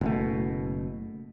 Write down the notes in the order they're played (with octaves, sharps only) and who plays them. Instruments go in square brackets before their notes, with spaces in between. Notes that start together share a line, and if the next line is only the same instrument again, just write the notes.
[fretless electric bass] F#1 B2 A3